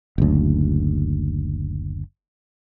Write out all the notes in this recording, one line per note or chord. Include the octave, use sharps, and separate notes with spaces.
F#1 D2